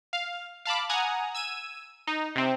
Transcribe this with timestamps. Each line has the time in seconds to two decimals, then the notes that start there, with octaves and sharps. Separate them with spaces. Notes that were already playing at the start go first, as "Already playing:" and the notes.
0.13 F5
0.66 F5 A5 B5 D6
0.89 F#5 G#5 A#5 D#6 G#6
1.35 E6 G#6 D#7
2.07 D#4
2.36 C3 C4